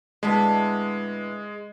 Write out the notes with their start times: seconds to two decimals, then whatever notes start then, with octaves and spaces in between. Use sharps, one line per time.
0.23 A2 D3 G#3 B3